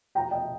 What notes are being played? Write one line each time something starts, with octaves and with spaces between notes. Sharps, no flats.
G5 A#5
D#5 G5